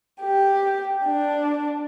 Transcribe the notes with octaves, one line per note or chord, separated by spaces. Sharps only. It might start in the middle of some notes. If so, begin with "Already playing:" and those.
G4
D4